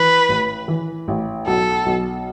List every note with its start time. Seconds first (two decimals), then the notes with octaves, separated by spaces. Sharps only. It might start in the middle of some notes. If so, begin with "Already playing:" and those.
Already playing: E3 B4
0.29 A1
0.68 E3
1.08 A1
1.46 B1 A4
1.86 B1